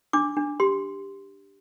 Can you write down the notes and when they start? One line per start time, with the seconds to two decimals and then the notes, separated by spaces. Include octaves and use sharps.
0.13 D4 D6
0.37 D4
0.60 G4 C6